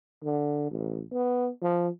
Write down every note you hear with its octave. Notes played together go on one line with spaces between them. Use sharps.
D3
A1
B3
F3